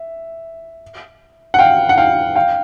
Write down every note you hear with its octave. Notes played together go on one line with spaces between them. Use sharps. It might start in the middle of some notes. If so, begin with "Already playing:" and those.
Already playing: E5
F#5
F5 G5
F#5
F5 G5
F5 G5